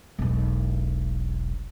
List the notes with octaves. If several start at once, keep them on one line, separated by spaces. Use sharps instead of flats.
E1 B1